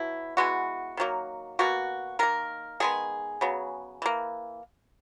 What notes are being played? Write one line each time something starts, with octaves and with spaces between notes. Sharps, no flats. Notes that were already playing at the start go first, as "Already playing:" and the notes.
Already playing: B2 F#3 E4
E3 G#3 B3 F#4
D#3 F#3 A#3
B2 A#3 F#4
D#3 A#3 A#4
D#3 G#3 B3 G#4
C#3 F#3 B3
E3 A#3